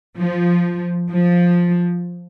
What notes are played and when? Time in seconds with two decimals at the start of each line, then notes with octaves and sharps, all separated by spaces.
0.17 F3
1.10 F3